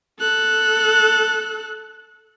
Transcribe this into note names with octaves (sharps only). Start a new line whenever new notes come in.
A4 F#6